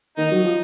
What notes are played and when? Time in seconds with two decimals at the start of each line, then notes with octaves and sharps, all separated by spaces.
0.17 D#3 D#4
0.31 F#3
0.44 F3